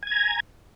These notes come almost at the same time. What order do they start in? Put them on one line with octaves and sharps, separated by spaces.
G#5 G#6 A#5